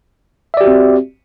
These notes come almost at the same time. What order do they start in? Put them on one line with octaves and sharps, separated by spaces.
E5 D5 G4 F#4 C4